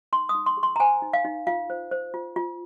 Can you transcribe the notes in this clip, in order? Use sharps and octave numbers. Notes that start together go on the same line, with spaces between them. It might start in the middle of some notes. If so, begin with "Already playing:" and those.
D#4 C6
D#6
D#4
C6
G#4
C6
A#5
C5 G#5
D#4
F5
D#4
F4 F5
C5
C5
F4
F4